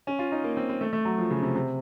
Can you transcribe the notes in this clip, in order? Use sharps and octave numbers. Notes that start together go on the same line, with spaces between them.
C#4
F4
D#4
A#3
C4
C4
A3
A3
F#3
F3
C#3
C3
C3